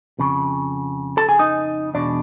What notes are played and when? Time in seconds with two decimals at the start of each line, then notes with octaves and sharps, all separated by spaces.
0.19 F2 C#3
1.17 A4 A5
1.29 G#4 G#5
1.39 D#4 D#5
1.94 E2 B2 G#3 D4 D5